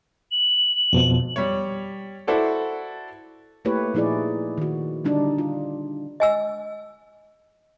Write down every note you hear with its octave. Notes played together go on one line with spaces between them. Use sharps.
F#7
F2 B2 F3
G3 C#5
E4 F#4 A4 C5 D5
A3 A#3 E4 G4 B4 C#5
A#2 F3 D#4 E4 G#4 D5
D#3 F#4
D3 G3 D4 D#4
F4
D#5 G#5 E6